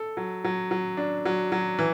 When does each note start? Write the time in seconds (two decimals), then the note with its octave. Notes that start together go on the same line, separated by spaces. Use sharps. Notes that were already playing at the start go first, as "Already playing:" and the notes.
Already playing: A4
0.17 F#3
0.44 F#3
0.71 F#3
0.97 D4
1.25 F#3
1.52 F#3
1.79 E3